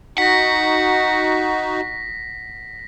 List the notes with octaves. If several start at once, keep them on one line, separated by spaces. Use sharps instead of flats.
D#4 F#4 F#5 A#6 B6